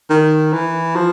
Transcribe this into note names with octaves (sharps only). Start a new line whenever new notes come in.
D#3
E3
F3